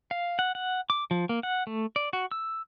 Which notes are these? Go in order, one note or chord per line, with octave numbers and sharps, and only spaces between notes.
F5
F#5
F#5
D6
F3
A#3
F#5
A3
D5
F#4
E6